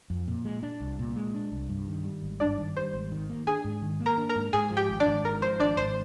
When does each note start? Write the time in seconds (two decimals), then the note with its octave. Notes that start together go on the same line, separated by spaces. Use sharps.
0.10 F2
0.28 A#2
0.45 G#3
0.63 D4
0.80 C2
0.99 A#2
1.16 G#3
1.34 D4
1.52 C2
1.70 G2
1.87 D#3
2.05 G3
2.22 G#1
2.40 G2 D4 D5
2.59 D#3
2.76 G3 C5
2.93 G#1
3.12 D#3
3.30 A#3
3.47 D4 G#4 G#5
3.64 G#2
3.82 D#3
4.00 A#3
4.06 A#4 A#5
4.17 D4
4.29 A#4 A#5
4.36 G#2
4.53 G#2 G#4 G#5
4.71 F3
4.77 G4 G5
4.89 G#1
5.00 D4 D5
5.06 G#1
5.24 G#2 A#4
5.41 F3 C5
5.60 G#1 D4 D5
5.77 G#1 C5